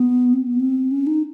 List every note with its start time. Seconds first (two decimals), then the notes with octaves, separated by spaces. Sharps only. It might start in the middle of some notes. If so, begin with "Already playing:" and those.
Already playing: B3
0.33 C4
0.47 B3
0.60 C4
0.91 C#4
1.07 D#4